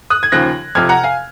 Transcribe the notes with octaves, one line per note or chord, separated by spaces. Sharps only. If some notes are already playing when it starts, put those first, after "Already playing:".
D#6 F#6
G#6
D#2 C#3 F3 F#6 A#6
F2 C3 F3 F6 G#6
F#5 A#5
F5 G#5